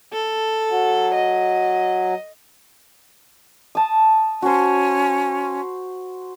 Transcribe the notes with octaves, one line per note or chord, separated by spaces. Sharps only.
A4
F#3
D#5
A5 D#6
C#4 F#4 C5